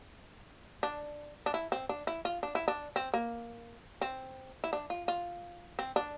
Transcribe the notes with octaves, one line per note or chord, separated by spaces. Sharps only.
D4
D4
E4
C4
D4
E4
F4
D4
E4
D4
C4
A#3
C4
E4
D4
F4
F4
C4
D4